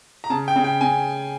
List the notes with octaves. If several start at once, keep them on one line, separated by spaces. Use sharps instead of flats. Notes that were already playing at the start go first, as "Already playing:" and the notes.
A#5
C#3 A5
G5
C#3
G5
C#3 G#5